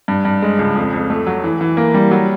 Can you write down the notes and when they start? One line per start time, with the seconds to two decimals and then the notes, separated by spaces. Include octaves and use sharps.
0.08 G2
0.25 G2
0.42 G#3
0.59 C#2
0.75 F2
0.93 F2
1.10 A3
1.27 F#3
1.44 E3
1.61 E3
1.77 A#3
1.94 G3
2.11 F#3